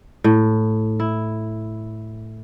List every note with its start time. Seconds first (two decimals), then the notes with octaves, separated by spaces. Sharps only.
0.24 A2
1.00 E4